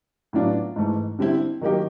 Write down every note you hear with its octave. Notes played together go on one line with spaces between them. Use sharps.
A2 F#3 B3 D4 F4
G#2 E3 A3
D3 G3 C4 E4
D#3 F#3 A#3 D#4 G4